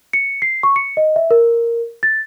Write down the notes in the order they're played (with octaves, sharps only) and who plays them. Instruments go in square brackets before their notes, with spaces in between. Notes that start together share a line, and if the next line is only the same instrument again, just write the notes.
[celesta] C#7
C7
C#6
C#7
D#5
E5
A#4
A6